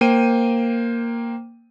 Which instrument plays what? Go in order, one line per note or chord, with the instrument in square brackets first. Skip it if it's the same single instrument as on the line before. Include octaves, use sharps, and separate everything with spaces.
[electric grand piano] A#3 C5 G5 D#7